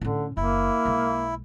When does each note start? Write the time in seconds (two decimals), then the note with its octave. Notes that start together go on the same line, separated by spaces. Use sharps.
0.01 A2 D3 C#4
0.37 F#1 A#3 E4
0.85 B1 G#3